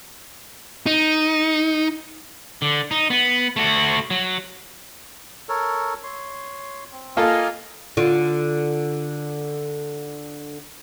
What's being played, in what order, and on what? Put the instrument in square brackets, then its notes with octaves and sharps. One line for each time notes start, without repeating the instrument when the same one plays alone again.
[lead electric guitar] D#4
[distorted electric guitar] D3
D#4
B3
A3 F#4
F#3
[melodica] A4 A#4 C#5
C#5 C6
C4
[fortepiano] A#3 F4 A4 [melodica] D#5 F5 G#5
[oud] D3 F4